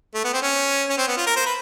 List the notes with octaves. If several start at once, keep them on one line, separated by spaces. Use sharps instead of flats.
A3
B3
C4
C#4
C#4
C4
B3
F4
A#4
C5
B4